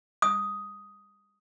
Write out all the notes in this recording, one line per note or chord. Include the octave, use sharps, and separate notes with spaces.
D#6